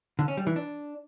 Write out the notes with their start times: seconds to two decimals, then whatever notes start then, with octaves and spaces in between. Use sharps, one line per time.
0.19 D3
0.28 C#4
0.37 G3
0.47 E3
0.56 D4